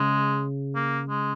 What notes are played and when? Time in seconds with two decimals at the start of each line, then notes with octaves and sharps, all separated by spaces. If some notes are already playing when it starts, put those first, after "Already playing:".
Already playing: C#3 G#3
0.75 A#3
1.09 G#3